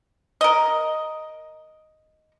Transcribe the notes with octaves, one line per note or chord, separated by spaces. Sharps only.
A#4 D#5